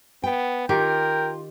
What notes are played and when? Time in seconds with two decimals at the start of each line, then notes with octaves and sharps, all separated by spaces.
0.24 B3 G5
0.69 D#3 F4 G4 A#4 G5